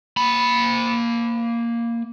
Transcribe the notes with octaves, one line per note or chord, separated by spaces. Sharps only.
A#3 B5